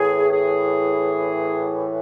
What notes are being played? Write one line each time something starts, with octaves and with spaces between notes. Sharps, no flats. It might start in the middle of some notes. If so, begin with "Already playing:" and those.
Already playing: A2 E3 G#4
G#4